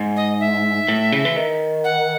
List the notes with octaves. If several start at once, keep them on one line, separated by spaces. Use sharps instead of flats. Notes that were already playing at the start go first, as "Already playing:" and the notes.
Already playing: G#2
D#5
E5
A2
C#3
E3
D#3
F#5